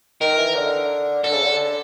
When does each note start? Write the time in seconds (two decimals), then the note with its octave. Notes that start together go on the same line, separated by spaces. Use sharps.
0.21 D#3 A#4
0.37 E3
0.55 D3
1.23 D3 A4
1.33 C#3
1.44 D3